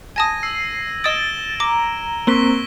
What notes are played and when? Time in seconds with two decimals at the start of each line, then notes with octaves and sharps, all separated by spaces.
0.16 G#5 A5 D#6 G#6 A#6 D#7
0.43 E6 C7 F#7
1.04 D#5 D#6 A6 D7 E7 G7
1.60 A#5 D6
2.27 A#3 C4 C#6 B6 G7